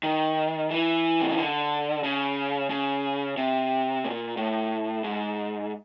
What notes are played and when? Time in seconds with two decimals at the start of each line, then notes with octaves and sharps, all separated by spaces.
0.03 D#3
0.70 E3
1.21 C3
1.29 C#3
1.37 D3
2.04 C#3
2.70 C#3
3.37 C3
4.05 A#2
4.37 A2
5.04 G#2